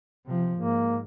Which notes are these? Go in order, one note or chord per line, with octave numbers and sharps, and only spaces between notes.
C3 F3
G#2 A#3